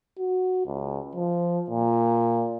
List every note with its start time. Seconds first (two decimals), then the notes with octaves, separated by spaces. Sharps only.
0.18 F#4
0.66 C#2
1.15 F3
1.70 A#2